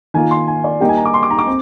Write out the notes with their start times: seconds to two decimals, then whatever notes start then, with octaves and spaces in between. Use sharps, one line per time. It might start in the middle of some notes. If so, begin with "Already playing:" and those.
0.14 D#3 A#3 F4 G#5
0.31 C6
0.47 G#5
0.64 D5
0.80 G3 A#3 D#4 G4 G5
0.89 G#5
0.97 A#5
1.05 D6
1.14 C6
1.23 D6
1.30 A#5
1.39 D6
1.47 C4